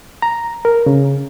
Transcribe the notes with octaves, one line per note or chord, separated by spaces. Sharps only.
A#5
A#4
C#3